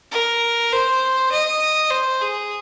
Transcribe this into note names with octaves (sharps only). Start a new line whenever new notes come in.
A#4
C5
D#5
C5
G#4